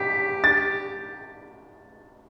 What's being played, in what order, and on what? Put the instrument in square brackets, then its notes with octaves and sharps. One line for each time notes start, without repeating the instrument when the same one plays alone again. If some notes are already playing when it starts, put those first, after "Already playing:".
Already playing: [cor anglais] G4 [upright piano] B6
[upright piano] A6